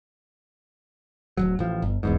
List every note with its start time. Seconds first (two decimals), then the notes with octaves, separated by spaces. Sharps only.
1.37 D1 A#1 F#3
1.59 A1 F3
1.82 G1
2.03 D#1 E2 G#2